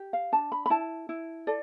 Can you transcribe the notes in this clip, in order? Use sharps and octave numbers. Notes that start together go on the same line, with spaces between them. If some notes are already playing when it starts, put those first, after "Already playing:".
Already playing: G4
F5
D4 A5
B5
B5
E4 A5
E4
A4 D5